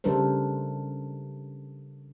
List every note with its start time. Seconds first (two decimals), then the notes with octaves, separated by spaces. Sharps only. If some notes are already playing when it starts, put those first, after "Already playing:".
0.04 C#3 G3 D4 A4 A#4 C5